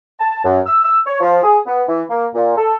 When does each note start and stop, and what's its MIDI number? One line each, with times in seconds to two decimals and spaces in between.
0.20 0.43 81
0.44 0.60 42
0.66 0.80 88
0.84 0.98 88
1.06 1.17 73
1.20 1.40 53
1.44 1.59 68
1.66 1.83 59
1.88 2.02 52
2.10 2.26 58
2.34 2.53 46
2.57 2.77 69